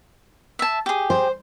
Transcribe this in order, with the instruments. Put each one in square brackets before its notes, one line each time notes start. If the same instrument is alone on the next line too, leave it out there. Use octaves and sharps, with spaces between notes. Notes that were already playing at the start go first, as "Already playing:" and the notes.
[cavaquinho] E5 A5
G4 G#4
[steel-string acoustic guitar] C5